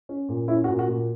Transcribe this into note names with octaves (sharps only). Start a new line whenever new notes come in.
C#4
A#2
C#4 E4
F#4
A#2
F#4
A#2